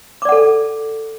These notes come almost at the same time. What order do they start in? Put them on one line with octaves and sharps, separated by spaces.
D6 D5 F#5 A4